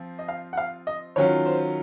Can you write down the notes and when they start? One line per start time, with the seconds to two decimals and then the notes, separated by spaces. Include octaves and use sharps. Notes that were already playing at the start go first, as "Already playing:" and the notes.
Already playing: F3 C4 F4
0.19 D#5
0.28 F5
0.53 F#5
0.57 F5
0.87 D#5
1.16 D#3 F#3 C#4 F4 C#5
1.46 C5